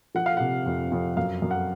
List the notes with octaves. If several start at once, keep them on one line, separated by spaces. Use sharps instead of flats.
F3 F#5
F5
C3 F#5
F2
F2
F#2 F5
F#2
F#5